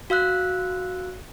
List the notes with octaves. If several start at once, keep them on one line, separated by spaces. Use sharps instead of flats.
F#4 F5 E6 F#6